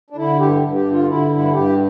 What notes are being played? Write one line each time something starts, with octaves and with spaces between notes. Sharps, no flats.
D4
D3 E4
G2 G4
G2
G4
D3
F4
D3 E4
G2 E4
G2 G4